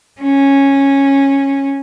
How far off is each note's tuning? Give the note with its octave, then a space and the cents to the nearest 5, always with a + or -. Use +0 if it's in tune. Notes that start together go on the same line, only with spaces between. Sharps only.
C#4 -10